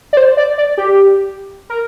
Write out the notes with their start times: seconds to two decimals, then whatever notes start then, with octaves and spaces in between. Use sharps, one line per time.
0.13 D5
0.17 C5
0.37 D5
0.58 D5
0.78 G4
1.70 A#4